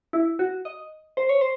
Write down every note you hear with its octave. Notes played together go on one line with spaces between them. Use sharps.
E4
F#4
D#5
C5
C#5
C5